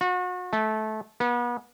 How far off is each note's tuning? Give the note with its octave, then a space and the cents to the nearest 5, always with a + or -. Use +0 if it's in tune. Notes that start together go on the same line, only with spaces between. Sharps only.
F#4 -35
A3 -20
B3 -35